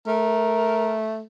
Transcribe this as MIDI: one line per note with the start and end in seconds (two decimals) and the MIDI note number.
0.07 1.22 57
0.07 0.96 70